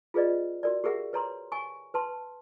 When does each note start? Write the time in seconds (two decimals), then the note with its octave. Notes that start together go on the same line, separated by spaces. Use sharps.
0.14 F4 G#4 B4 D5 D#5
0.63 F#4 A#4 D5
0.84 G4 G#4 A#4 E5 F#5
1.13 B4 C#5 A#5 C6
1.52 G#5 C#6
1.94 B4 A5 C6